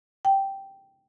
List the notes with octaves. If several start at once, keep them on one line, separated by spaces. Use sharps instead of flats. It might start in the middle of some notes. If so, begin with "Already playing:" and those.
G5